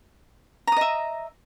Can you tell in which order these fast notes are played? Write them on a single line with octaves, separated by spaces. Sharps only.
A#5 D#6 D#5 E5